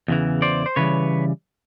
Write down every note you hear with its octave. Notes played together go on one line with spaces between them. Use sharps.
E2 C#3 E3
C5 D5
C5
C#3 E3 G3 B4 C#5